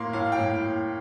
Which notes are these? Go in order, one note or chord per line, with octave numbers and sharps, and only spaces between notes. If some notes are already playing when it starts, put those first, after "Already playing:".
Already playing: A2 A#3 C6
A2 F5
G5
A2